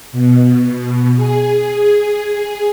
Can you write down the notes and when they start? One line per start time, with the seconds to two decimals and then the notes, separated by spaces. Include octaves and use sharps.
0.12 B2
1.16 G#4